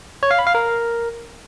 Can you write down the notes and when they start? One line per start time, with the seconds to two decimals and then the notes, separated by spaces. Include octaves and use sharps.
0.23 C#5
0.31 F5
0.39 B5
0.47 F5
0.55 A#4